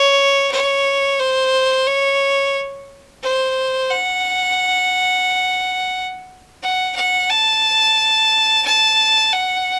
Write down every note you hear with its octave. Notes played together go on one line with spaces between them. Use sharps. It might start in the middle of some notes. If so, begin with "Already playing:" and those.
Already playing: C#5
C#5
C5
C#5
C5
F#5
F#5
F#5
A5
A5
F#5